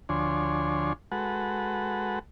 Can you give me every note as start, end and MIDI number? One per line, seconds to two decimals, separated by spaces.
0.09 0.93 38
0.09 0.93 53
0.09 0.93 62
0.09 0.93 73
0.09 0.93 80
0.09 0.93 84
1.12 2.19 56
1.12 2.19 66
1.12 2.19 69
1.12 2.19 71
1.12 2.19 78